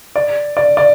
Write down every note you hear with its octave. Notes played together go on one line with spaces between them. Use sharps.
D5
D5
D5